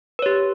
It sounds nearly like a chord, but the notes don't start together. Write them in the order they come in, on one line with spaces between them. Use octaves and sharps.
B4 C#5 G4